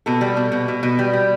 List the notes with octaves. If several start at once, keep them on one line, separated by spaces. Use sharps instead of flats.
B2 A4
G3
B2
B2
B2
B2
G3
G3